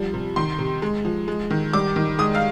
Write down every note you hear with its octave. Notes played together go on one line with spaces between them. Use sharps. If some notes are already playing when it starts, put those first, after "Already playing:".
Already playing: F3 G3
C3
D#3 C6
C3
G#3
F3
G#3
D#3
G3 D6
D#3
G#3 D#6
F5